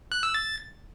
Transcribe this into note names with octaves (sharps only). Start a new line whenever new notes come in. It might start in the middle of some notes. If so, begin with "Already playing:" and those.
F#6
E6
A6